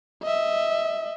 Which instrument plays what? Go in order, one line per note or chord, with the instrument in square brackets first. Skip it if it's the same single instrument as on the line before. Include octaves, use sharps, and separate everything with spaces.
[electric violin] D#5 E5